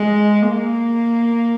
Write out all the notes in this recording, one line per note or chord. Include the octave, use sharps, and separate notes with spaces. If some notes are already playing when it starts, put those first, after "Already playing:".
Already playing: G#3
A#3